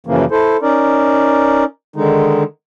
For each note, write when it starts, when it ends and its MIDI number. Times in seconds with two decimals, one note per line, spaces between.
0.06 0.25 42
0.06 0.25 49
0.06 0.25 52
0.06 0.25 53
0.06 0.25 58
0.31 0.57 64
0.31 0.57 69
0.31 0.57 72
0.62 1.64 61
0.62 1.64 63
0.62 1.64 70
0.62 1.64 74
1.96 2.43 50
1.96 2.43 51
1.96 2.43 56
1.96 2.43 63